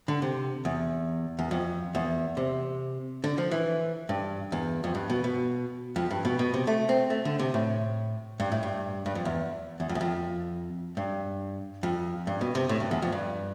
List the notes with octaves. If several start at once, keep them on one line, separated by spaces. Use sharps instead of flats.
D3
C3
E2
E2
F2
E2
C3
D3
F3
E3
G2
E2
F2
G2
B2
B2
F2
G2
B2
B2
C3
A3
C4
A3
D3
C3
A2
G2
A2
G2
G2
F2
E2
E2
F2
E2
F2
G2
F2
G2
B2
C3
A2
G2
E2
F2
G2